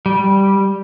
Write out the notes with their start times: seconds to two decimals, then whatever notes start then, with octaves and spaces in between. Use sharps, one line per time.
0.06 G3